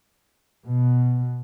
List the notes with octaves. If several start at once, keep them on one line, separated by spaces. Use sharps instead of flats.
B2